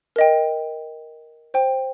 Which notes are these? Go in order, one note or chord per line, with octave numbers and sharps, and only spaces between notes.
A#4 D#5 G5
C5 G5